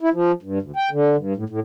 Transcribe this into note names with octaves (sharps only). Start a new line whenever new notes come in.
E4
F3
G2
D2
G5
D3
G2
A2
A2